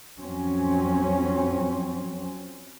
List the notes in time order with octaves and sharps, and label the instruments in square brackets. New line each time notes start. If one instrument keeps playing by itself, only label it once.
[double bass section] F2 F#3 C4 C#4